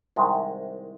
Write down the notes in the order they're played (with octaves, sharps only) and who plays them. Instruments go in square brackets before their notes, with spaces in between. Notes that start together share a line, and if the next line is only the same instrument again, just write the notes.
[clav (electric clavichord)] C2 C3 D#3 G#3